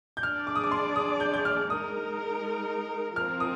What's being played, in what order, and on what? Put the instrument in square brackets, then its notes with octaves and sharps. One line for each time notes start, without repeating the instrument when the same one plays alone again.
[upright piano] G6
[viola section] D4 G#4 D5 [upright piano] F6
[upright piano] D6
D#6
D6
C6
D#6
G6
G6
F6
[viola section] G#3 D#4 A#4 [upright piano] D#6
[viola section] F3 C4 F4 A#4 [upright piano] F6
[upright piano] D#6